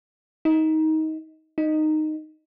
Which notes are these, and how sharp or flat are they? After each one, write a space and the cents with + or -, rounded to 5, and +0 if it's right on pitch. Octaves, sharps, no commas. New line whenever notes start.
D#4 +20
D#4 -10